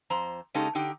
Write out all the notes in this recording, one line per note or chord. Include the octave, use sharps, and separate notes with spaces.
F2 C5 A#5
C#3 G#3 C#4 D#4 G4 A4
D3 D#4 G4 G5